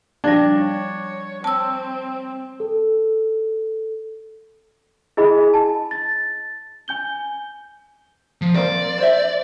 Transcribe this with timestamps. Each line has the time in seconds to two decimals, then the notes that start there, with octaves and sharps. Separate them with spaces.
0.24 F3 G3 D4
0.57 C#5
1.44 C4 A5 E6
2.60 A4
5.17 E4 G#4 D#5 G#5 B5
5.54 A5
5.91 A6
6.88 G#5 G6 G7
8.41 F3
8.55 A#3 C4 D5
8.98 C5 E5